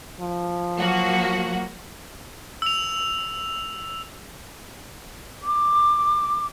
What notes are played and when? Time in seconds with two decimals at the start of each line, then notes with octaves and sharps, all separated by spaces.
0.20 F3
0.78 F#3 A#3 F#4
2.62 E6 F7
5.42 D6